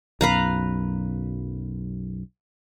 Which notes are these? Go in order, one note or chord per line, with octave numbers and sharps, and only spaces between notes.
B1 F#2 B4 F5 A#5